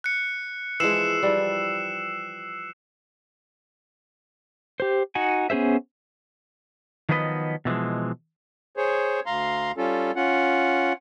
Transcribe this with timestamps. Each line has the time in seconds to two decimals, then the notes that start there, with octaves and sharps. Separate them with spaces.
0.04 F#6 C#7
0.80 E3 F3 G#3 E6 C7 E7
1.23 E3 F3 G3
4.80 G4 C5
5.15 D#4 F#4 F#5 G#5
5.50 B3 C#4 G#4 C5 E5
7.09 D#3 F3 F#3 B3 B4 D#5
7.65 B2 E3 F3 G#3
8.77 G#4 C5 C#5
9.26 D2 F5 A#5 C6
9.77 G3 C#4 F4 A4
10.16 C#4 F4 F#5